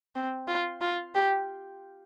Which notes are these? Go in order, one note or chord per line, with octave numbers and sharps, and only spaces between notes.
C4
F4
F4
G4